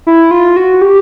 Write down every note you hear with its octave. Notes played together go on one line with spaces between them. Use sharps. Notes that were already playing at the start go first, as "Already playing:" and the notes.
E4
F4
F#4
G4